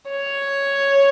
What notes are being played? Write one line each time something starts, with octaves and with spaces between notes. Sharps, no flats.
C#5